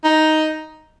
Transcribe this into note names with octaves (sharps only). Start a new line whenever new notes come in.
D#4